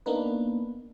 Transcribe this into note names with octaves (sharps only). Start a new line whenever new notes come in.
A#3 B3 D4 D#4 B4